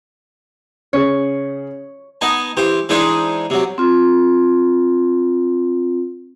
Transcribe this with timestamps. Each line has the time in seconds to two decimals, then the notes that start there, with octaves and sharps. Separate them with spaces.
0.93 C#3 C#4 G#4 C#5
2.21 B3 D#4 D#5 G#5 A5
2.57 E3 G4 C5
2.89 E3 G#3 D4 D#4 G#4 C5
3.50 C3 F#3
3.78 C4 F4